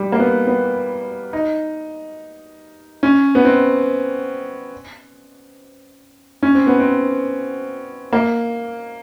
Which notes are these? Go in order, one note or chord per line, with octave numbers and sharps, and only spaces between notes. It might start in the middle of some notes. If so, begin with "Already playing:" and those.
Already playing: G3
A#3
B3
B3
D#4
C#4
B3
C4
C#4
C4
B3
C4
A#3